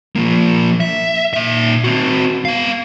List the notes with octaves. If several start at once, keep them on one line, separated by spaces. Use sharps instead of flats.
F3 A#3
E5
A#2 E5
C4 F#4
B3 F5